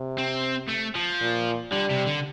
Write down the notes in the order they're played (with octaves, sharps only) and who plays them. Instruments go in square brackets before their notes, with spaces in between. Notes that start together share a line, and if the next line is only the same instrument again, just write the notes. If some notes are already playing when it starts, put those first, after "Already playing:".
Already playing: [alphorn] C3
[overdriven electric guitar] C4
A3
F3
[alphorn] A#2
[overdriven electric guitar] D3 [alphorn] G3
[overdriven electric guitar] C3
D3